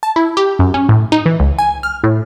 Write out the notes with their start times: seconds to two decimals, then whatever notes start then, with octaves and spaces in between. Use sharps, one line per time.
0.03 A5
0.16 E4
0.37 G4
0.59 F#2
0.74 C#4
0.89 A2
1.12 D#4
1.26 E3
1.40 C#2
1.59 G#5
1.83 F6
2.04 A2